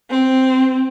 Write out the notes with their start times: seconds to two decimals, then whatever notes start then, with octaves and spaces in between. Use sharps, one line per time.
0.11 C4